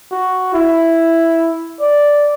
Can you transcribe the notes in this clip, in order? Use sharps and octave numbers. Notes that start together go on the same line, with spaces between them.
F#4
E4
D5